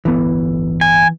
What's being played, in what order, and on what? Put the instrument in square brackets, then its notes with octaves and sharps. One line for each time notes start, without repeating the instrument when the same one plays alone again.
[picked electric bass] D1 G1 B3 [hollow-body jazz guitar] E3
[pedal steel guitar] G#5